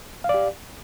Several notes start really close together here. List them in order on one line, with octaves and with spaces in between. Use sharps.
F5 D5 G4